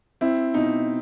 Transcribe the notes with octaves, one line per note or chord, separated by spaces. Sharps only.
C4 E4
B2 D#4